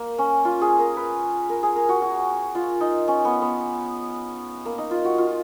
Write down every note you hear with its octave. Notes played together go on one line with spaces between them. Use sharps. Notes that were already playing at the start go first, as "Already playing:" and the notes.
Already playing: A#3
C#4
F4
G#4
A#4
B4
A#4
G#4
A#4
F#4
F#4
F4
D#4
C#4
B3
B3
A#3
D#4
F4
F#4
F4